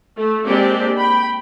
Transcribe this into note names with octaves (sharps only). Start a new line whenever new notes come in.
A3
G#3 A#3 C4 D4 G4 D5
G5 B5